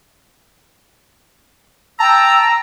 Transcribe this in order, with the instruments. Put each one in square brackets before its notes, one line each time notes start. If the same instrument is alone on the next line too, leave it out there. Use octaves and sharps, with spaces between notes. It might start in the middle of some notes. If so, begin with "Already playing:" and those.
[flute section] G5 E6 [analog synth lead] A5 [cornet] A#5